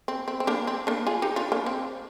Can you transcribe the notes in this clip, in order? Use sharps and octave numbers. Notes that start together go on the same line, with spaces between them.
C4
C4
C4
A#3 D4
C4
A#3 D4
F4 G#4
D#4 G4
D4 F4
A#3 D4
C4